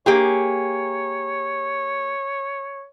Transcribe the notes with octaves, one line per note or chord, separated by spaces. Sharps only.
A#3 G4 G#4 C#5